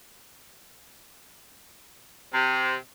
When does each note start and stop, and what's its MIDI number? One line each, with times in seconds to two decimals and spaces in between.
2.34 2.76 48